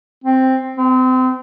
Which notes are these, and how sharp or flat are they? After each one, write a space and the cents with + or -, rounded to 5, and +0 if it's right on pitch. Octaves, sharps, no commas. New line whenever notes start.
C4 +0
C4 -30